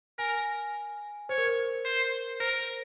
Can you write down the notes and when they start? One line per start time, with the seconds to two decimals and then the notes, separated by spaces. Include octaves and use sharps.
0.19 A#4 G#5
1.29 C5 C#5
1.38 A#4
1.46 C5
1.85 C5
2.40 A#4 C5